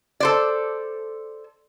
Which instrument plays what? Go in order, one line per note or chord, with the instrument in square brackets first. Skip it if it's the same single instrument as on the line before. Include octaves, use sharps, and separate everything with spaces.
[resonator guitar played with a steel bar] A4 C5 D5